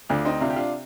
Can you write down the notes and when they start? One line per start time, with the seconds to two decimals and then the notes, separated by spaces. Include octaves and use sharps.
0.09 D2 D4 F4
0.25 C4 D#4
0.40 C3 D4 F4
0.50 G4
0.56 D4 F4